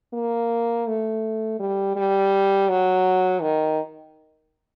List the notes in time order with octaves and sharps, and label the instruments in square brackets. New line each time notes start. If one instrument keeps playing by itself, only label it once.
[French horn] A#3
A3
G3
G3
F#3
D#3